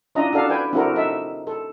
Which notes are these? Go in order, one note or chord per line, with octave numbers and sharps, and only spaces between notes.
C#4 D4 E4 F4 D#5 A#5
D4 F#4 A4 F5
B4 G5 G#5
C4 D4 E4 F#4 A4 A#4
D#4 A4 E5
A4